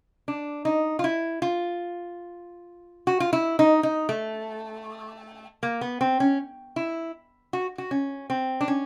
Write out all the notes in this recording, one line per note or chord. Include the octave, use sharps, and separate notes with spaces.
D4
D#4
F4
E4
F4
F#4
F4
E4
D#4
D#4
A3
A#3
B3
C4
C#4
E4
F#4
F#4
C#4
C4
D4
C#4